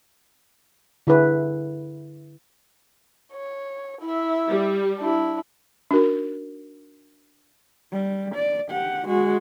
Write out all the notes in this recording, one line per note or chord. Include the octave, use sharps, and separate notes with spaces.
D3 E4 G#4 B4
C#5
E4 E5
G3
D4 E4
D4 D#4 F#4 A#4
G3
D5
G4 F#5
G#3 F#4